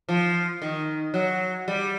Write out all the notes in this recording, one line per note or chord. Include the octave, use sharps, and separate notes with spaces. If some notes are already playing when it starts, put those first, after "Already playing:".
F3
D#3
F#3
G3